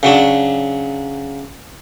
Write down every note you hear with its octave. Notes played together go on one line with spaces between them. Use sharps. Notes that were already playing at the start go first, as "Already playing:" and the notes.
C#3 F#3 D4